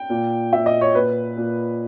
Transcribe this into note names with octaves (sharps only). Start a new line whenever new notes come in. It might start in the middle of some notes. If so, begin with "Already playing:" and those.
Already playing: G5
A#2
A#2 E5
D#5
C#5
A#2 B4
A#2